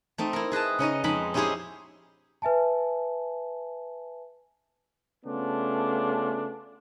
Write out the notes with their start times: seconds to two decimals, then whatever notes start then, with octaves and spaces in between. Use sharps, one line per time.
0.18 A3 C4 D#4
0.33 E4 A#4
0.52 G#4 B4 D#5 A5
0.79 C#3 C#4 D#4 D#5
1.04 F2 G#3 D#4 B5
1.34 C#4 D#4 E4 G4 G#4 C5
2.42 B4 E5 G#5 A5
5.25 C#3 A3 B3 C#4 D4 F4